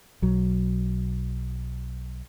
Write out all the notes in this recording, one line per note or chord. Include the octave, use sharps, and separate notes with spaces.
B1 F#3